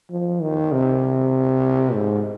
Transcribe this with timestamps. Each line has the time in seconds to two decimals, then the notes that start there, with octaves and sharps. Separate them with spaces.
0.10 F3
0.42 D#3
0.72 C3
1.94 G#2